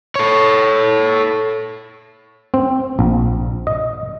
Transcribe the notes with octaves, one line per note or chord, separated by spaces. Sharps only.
A4 C#5
C4
A#1
D#5